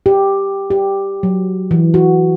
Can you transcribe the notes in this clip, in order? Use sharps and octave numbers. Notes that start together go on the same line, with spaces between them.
G4
G4
F#3
E3
F#4